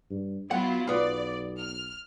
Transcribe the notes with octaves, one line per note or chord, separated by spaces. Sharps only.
G2
F#3 B3 E4 F4 F#5
B1 B3 F4 D5
F6